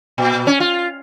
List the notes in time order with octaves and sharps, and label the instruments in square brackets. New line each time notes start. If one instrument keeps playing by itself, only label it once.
[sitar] A#2
C#4
F4